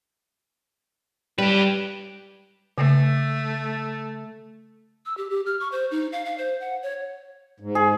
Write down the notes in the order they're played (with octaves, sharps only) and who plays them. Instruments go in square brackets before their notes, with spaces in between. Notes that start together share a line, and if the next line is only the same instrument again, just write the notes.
[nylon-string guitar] G3 [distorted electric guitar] G4 B4
[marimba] C#3 [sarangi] A3
[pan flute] E6
G4
G4
F6
C#6
C5
D#4
F5
F5
C5
F#5
C#5
[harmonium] G#2
[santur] G#4